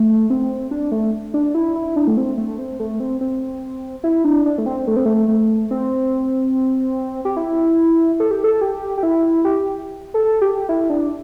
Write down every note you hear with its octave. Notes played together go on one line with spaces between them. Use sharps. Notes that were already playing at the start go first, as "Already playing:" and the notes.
Already playing: A3
C4
D4
A3
D4
E4
E4
D4
A3
C4
A3
C4
A3
C4
C4
E4
D4
D4
A3
C4
A3
C4
A3
A3
C4
G4
E4
A4
G4
A4
G4
G4
E4
G4
A4
G4
E4
D4